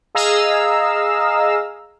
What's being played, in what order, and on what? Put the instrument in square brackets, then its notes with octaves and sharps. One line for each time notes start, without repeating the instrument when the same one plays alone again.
[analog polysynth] G#4 D#5 F5 A#5 E6